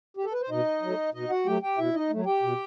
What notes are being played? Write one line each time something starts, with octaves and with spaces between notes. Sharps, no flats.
G4
A4
B4
C5
B2 D#4 D#5
F#3 A3
B2 D#4 D#5
F#4 F#5
F#3 A3 G4 G5
G4 G5
B2 E4 E5
D#4 D#5
F#3 A3
G4 G5
B2